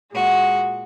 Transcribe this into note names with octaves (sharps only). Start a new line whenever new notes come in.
A#2 G#3 F#4